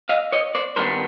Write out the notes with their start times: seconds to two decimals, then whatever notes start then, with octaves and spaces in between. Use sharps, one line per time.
0.09 D#5 F5
0.32 C#5 D#5
0.55 C5 D5
0.76 G2 D#3 G3 B3 D4 A#4 C5